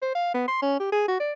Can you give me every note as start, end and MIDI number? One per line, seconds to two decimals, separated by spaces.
0.02 0.13 72
0.15 0.34 77
0.34 0.47 59
0.48 0.61 84
0.62 0.76 61
0.80 0.87 67
0.92 1.05 68
1.08 1.18 66
1.20 1.33 74